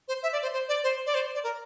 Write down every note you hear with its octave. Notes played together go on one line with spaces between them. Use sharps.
C5
E5
D5
C5
C5
D5
C5
D5
C5
D5
A#4